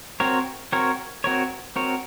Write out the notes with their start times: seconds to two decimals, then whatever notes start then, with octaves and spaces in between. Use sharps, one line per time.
0.20 C4 F#4 A#4 C#5
0.72 C4 F#4 A#4 C#5
1.24 C4 F#4 A#4 C#5
1.76 C4 F#4 A#4 C#5